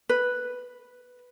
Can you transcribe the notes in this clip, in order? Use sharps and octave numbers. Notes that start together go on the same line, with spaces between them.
B4